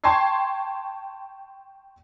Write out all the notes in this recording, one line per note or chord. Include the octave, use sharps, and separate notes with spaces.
G5 A5 C6 C#6 G#6 C7